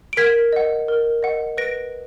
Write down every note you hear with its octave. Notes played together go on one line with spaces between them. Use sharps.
D7
A#4 G#6 B6
D#5 F#5
A#4
D#5 F#5
B4 A#6 D7